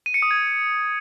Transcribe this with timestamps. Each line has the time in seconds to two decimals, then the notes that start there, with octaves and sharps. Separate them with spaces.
0.06 D#7
0.14 C#7
0.22 D#6
0.31 G#6